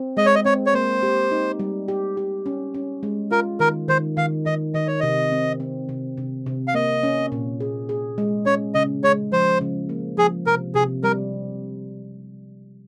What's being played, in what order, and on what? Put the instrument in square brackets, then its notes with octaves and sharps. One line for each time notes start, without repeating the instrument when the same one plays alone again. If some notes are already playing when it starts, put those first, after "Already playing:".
Already playing: [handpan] C4
[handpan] G#3 [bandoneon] D#5
[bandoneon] C#5
D#5
[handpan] C4 [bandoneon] C#5
[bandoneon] C#5
[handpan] A#3 [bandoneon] C5
[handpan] G4
D#4
G3
G4
G4
C#4
C#4
G#3
[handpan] F4 [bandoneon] A#4
[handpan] D#3 [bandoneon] A#4
[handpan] D#3 [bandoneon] C5
[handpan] D#3 [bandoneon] F5
[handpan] D#3 [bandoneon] D#5
[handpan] D#3 [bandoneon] D#5
[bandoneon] C#5
[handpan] C3 [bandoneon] D#5
[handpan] C4
C4
C3
C3
C3
[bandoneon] F5
[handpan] A#3 [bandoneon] D#5
[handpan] C#4
A#2
G#4
G#4
G#3
[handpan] C#4 [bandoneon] C#5
[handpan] C#3 [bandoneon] D#5
[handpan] G#3 [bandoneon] C#5
[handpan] F3 [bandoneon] C5
[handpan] C#3
A#3
[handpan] F3 [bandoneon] G#4
[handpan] C3 [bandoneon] A#4
[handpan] C3 [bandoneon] G#4
[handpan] G3 [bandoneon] A#4